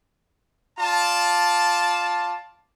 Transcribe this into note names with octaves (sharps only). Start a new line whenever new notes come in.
F4 D5 A5